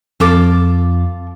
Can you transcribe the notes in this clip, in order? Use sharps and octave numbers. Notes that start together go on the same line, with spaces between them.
F2 F4 A4 D6